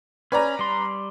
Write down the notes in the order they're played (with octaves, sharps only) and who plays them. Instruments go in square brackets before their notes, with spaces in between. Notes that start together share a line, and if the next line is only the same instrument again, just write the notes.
[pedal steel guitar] C#4 [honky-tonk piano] B4 D5 A#5
[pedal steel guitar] G3 C6